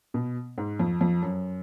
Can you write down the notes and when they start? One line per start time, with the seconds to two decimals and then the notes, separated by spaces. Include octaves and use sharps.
0.14 B2
0.58 G#2
0.79 F2
1.01 F2
1.22 F#2